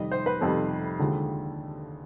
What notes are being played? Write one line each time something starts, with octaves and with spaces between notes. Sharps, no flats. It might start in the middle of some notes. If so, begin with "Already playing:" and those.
Already playing: F2 C3 D#3 G3 D#5
C5
B4
F2 C3 D#3 G3 A4
D#2 D3 F3 G#3